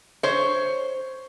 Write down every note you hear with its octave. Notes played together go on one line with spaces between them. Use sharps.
C5 C#5